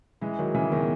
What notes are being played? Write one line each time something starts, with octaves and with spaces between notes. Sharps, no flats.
E3 G#3
D#3 F#3
C#3 E3
B2 D#3